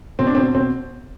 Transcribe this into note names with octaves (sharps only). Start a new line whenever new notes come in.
B2 C4
D4
B2 C4
B2 C4